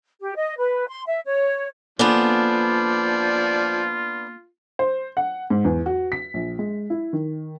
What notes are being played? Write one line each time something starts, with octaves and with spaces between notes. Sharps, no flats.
G4
D#5
B4
C6
E5
C#5
F3 A#3 B3 D4 F4 A4 D5 G#5
C5
F#5
G#2
E2
F#4
B6
A#1
G#3
E4
D#3